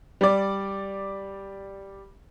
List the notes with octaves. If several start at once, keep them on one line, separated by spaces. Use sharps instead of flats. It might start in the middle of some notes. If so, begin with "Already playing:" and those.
G3 D5